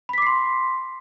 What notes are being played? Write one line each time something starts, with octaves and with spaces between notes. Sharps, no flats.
B5 C6 D6 B6 C7